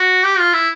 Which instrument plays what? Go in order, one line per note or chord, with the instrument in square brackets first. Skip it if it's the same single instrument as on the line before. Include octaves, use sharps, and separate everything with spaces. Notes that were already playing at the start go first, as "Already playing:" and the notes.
Already playing: [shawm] F#4
G4
F4
E4